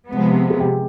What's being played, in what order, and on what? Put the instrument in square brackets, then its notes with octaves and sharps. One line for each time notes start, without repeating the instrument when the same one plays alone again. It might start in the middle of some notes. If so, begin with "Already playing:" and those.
[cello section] C3 F3 G#3 B3
[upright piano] G#4
G4